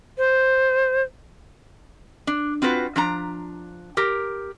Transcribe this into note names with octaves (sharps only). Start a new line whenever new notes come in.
C5
D4
C4 F4 F#4 B4
F3 D4 A#5
G4 A#4